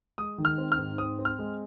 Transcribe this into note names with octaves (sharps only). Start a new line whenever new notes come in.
G#3 D#6
D#3
F6
C4
F6
G#2
C4 D#6
C4
F6
G#3